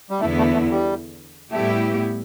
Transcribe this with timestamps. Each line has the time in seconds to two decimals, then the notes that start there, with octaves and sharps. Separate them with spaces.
0.10 G3
0.21 E2 D3 A3 B3 E4
0.38 A3
0.54 A3
0.70 G3
1.51 A2 G3 A3 B3 E4 G4